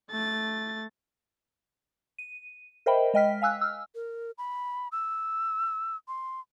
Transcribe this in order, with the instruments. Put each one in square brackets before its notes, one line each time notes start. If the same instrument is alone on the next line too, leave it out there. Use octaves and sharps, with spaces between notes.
[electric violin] A3 A6
[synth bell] D#7
A#4 C5 D#5 E5 G5 B5
G#3 D#5 G5 F6 B6
F5 G#5 E6 F#6
E6 F6
[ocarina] A#4
B5
E6
C6